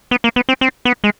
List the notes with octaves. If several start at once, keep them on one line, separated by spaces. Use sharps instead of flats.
B3
A#3
B3
C4
C4
B3
G#3